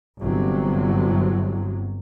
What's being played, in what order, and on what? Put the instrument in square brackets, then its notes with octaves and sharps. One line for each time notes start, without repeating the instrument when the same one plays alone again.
[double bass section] G1 C3 F#3